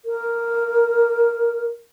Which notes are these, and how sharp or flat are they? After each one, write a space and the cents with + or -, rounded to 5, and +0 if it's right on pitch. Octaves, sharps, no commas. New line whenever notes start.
A#4 +0